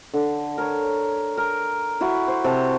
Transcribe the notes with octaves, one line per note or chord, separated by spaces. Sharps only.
D3
A#4 C#5
A#4
E4 F#4
C5
C3 A4